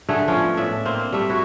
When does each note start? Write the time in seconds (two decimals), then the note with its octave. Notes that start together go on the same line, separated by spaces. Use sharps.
0.09 D3 A3 G#4
0.28 F3 B3 C#4
0.57 A2 D5 E5
0.86 A#3 C4 C5
1.12 G3 A3 E5
1.30 E4 F#4